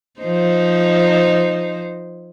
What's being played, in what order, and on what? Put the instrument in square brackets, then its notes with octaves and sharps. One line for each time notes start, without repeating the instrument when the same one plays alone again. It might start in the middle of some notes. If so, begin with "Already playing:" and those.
[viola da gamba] F3 D#4 C5